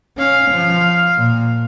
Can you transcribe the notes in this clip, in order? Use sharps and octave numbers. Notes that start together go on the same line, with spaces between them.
C#4 F5
F3
A#2